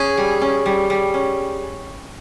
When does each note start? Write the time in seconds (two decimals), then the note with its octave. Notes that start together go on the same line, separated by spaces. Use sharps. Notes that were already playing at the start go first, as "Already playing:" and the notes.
Already playing: C#4 G#4
0.17 G3
0.41 C#4
0.66 G3
0.90 G3
1.14 C#4